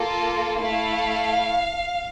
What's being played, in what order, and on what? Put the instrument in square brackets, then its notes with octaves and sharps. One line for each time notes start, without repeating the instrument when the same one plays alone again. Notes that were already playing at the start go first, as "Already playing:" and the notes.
Already playing: [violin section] A#3 F4 A4
A3 E4 A4 F5